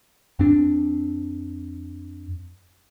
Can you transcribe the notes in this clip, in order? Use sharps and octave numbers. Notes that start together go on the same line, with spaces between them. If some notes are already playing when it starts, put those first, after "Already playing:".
F2 C4 D4